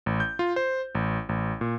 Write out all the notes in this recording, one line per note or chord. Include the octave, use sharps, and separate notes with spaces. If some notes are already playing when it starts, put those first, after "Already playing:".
A1
G6
F4
C5
A1
A1
A#2